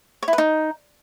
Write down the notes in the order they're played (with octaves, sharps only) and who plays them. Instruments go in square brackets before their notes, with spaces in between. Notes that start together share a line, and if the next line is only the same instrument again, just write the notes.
[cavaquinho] C#5
E4
B4
D#4